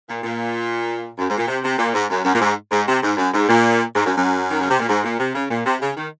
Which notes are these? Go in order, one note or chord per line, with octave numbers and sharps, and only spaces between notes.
A#2
A#2
F#2
G#2
A#2
C3
C3
A#2
G#2
F#2
F#2
A#2
G#2
G#2
C3
G#2
F#2
G#2
A#2
G#2
F#2
F#2
D#3
C#3
C3
A#2
G#2
A#2
C3
C#3
A#2
C3
C#3
D#3